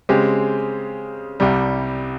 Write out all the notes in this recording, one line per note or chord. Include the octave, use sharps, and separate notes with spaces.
C#3 G#3 C4 G4
C2 C3 G3